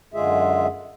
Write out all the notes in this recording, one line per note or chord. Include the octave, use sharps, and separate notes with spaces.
F#2 D3 G#3 F4 G#4 E5